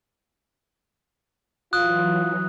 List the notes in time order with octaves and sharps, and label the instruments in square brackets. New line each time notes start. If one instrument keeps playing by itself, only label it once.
[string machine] E3 F#3 [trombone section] F4 [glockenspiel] D#6 F#6